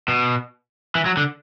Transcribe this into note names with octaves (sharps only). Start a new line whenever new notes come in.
B2
E3
F#3
D3